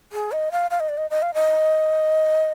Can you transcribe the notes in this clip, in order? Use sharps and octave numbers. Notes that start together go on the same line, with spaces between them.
G#4
D#5
F5
F5
D#5
D5
D#5
D#5
F5
D#5